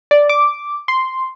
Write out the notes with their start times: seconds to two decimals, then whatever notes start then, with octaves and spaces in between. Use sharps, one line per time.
0.11 D5
0.29 D6
0.88 C6